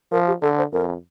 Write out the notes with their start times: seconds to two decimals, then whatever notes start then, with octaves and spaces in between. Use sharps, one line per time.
0.12 F3 A#4
0.27 G4
0.41 D3 A4
0.58 C5
0.72 F2 A#4